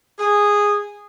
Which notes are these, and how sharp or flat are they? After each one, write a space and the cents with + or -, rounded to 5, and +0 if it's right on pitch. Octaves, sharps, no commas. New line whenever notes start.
G#4 -10